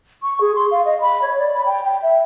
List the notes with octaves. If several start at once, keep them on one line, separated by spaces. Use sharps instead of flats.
C#6
G#4
C6
F5
D#5
B5
C#5
D5
B5
G5
G5
E5